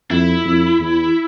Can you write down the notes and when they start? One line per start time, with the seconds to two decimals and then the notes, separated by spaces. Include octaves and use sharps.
0.10 F2 E4
0.45 F2
0.80 E2